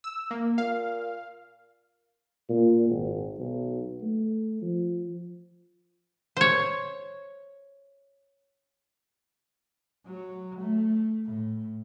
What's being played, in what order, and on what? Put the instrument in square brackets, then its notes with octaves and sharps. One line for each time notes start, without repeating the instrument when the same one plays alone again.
[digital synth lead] E6
A#3
[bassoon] A#2 [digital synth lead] F5
[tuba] A#2
G#1
B1
A3
F3
[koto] C5 C#5
[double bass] F#3
A3
A2